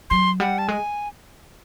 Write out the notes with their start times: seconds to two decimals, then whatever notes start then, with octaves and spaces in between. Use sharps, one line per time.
0.10 F#3 C6
0.40 G3 F#5
0.58 A5
0.68 G#3 G#5